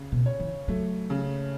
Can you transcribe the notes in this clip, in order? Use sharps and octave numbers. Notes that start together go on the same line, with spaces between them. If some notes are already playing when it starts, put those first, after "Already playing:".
Already playing: C#3
B2
C#5
E3
F#3 A3
C#3